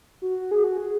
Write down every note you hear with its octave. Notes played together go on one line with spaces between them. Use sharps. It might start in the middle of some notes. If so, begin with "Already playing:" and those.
F#4
G#4
F#4
G#4